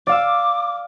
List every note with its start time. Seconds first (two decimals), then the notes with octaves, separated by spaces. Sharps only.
0.07 D5 F5 D6 E6